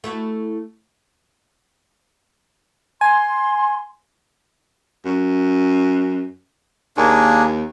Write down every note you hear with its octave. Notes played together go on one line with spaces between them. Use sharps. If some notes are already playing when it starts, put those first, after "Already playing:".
A3 E4 F#4
G#5 C6
F#2
D#2 A#3 D4 G#4